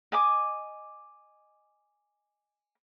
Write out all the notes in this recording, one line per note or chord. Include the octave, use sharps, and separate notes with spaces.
D#5 G#5 D6